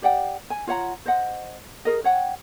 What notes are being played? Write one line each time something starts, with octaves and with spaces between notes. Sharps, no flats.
G4 D5 F#5 G5
G#5
F4 C#5 F#5 A#5
C5 D#5 F#5
G#4 A#4 D#5
C#5 F#5 G5